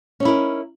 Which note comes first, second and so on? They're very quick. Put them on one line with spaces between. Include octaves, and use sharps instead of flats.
C#4 D#4 E4 A#4